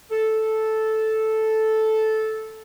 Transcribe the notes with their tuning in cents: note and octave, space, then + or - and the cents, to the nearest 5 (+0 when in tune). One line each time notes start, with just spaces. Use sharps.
A4 -5